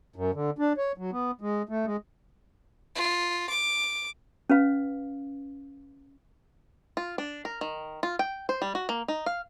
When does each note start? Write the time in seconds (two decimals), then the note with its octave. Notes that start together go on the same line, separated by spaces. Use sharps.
0.16 F#2
0.34 D3
0.59 D4
0.77 C#5
0.97 F#3
1.12 B3
1.41 G#3
1.69 A3
1.86 G#3
2.95 F4
3.49 D6
4.50 C#4 B4 F5
6.97 F4
7.18 D4
7.45 A#4
7.61 D#3
8.03 F4
8.19 G5
8.49 C5
8.62 G3
8.75 F#4
8.89 A#3
9.08 D#4
9.26 F5